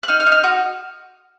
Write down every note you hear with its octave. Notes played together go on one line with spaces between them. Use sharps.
F#6
D#4 F6
F6
D#4
F6
F#4 D#6